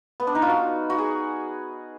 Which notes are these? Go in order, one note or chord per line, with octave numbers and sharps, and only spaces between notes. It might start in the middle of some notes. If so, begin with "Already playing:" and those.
B3
D4
D#4
F4
F#4
F#4
G#4